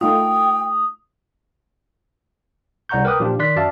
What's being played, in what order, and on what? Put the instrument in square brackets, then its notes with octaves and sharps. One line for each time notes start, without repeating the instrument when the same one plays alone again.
[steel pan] A3 D#4 F4 [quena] G5 [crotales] D#6
[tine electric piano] C2 D5 F#5 A#5 C#6 G6
A#4 B4 G5 D6 D#6 F#6
A#2 F3 F#3 D4 F4 G4
D#3 D5 C6 F#6 B6
F#2 F#4 D5 E5 F5 A5